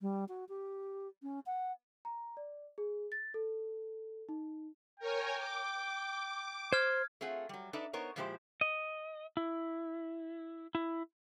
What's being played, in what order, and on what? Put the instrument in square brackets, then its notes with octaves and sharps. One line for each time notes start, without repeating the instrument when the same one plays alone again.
[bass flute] G3
F#4
G4
C#4
F#5
[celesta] A#5
D5
G#4
A6
A4
D#4
[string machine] A#4 C#5 G#5 [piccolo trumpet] G5
[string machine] D6
[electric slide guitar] C5 [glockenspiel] F6 G#6
[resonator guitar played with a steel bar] A3 C4 F4 G#4 F#5
F#3 G3
D4 D#4 A4 B4 D5 E5
B3 D#4 A#4 C5 C#5
A#2 F3 G#3 E4 G4 C5
[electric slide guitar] D#5
E4
E4